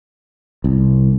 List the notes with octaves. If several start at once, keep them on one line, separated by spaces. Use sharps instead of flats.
C2